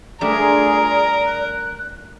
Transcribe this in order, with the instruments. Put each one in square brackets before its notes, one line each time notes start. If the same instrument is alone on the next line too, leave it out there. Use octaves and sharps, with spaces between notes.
[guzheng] G3 A3 D4 [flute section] F4 G#4 A#5 [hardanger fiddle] A#4 [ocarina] D5
[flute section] F#6